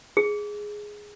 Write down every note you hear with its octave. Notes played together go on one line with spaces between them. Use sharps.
G#4